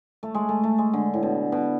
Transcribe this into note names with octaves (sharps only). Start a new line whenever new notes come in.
A3
G#3
A3
A3
G#3
D3
A2
B2
B2